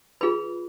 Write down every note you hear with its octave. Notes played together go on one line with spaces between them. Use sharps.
F4 G#4 B4 B5